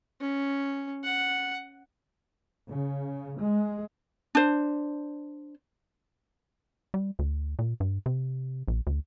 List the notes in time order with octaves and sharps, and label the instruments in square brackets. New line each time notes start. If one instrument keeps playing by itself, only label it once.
[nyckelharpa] C#4
F#5
[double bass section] C#3
G#3
[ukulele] D4 C5
[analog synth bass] G3
D2
A#2
G2
C3
A#1
D2